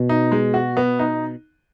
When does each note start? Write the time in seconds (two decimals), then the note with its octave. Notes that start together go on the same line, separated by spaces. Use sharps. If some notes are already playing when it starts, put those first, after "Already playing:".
Already playing: B2
0.09 D#4
0.32 G#3
0.54 F#4
0.77 B3
0.99 D#4